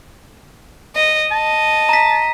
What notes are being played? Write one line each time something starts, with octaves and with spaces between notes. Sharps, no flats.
D#5
D#5 A5
A#5 B6